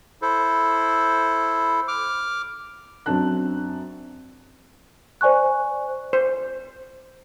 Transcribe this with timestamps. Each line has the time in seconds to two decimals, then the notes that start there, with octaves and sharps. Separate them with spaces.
0.22 E4 A4 C5
1.88 D6 F6
3.06 F#2 C4 D4 A5 F#6
5.21 C5 D5 G#5 C#6 F#6
6.13 C5